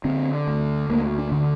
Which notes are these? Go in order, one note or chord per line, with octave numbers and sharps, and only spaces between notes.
D3 C4
D2
D2 A#3
D4
D3